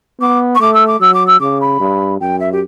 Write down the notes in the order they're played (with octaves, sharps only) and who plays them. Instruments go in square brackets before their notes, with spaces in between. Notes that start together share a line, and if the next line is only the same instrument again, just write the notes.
[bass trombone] B3 [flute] D6
[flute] C#6
[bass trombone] A3 [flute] D6
[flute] E6
D6
[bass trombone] F#3 [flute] E6
[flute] D6
E6
[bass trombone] C#3 [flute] D6
[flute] B5
[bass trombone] G2
[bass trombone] F#2 [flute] G5
[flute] E5
G4